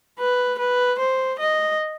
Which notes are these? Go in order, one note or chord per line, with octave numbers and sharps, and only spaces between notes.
B4
B4
C5
D#5